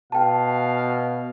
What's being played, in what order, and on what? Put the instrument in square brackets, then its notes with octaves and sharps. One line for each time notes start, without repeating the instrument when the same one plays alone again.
[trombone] B2 [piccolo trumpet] F5 [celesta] G5 A5